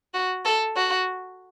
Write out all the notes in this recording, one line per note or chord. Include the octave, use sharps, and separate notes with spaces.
F#4
A4
F#4